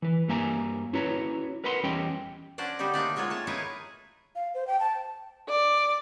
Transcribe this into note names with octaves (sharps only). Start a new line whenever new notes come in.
E3 B4
G2 G3 A#3 E5 G#5 A#5
C#4 E4 F#4 B4 C#5 A#5
A#4 B4 D#5 F#5 B5 C6
E2 G3 C#4 D#5 G5
C#4 D4 F#4 C5 D5
D3 G3 D#4 G4 C5
A3 A#3 C4 D4 D#4 D5
F#3 G#3 A#3 F4 C#5
A3 C#5 A5
D#4 E4 G#4 A#4 B4 C#5
F5
C5
G5
A5
D5